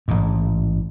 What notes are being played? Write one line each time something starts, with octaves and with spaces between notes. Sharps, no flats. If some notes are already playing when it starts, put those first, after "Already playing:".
A1 G#2